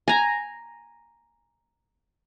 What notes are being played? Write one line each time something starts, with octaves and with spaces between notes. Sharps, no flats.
G#5 A#5